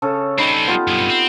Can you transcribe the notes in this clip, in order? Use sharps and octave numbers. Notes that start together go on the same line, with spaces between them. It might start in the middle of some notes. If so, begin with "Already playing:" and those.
C#3 A4 C#5
G3 C4 D#4 B5
B3 F4 G4
B1 G2
C4